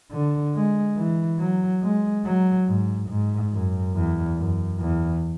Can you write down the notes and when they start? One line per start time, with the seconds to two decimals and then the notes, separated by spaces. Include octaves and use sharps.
0.11 D3
0.55 G#3
0.97 E3
1.39 F#3
1.82 G#3
2.25 F#3
2.68 G#2
3.09 G#2
3.52 F#2
3.95 E2
4.37 F#2
4.79 E2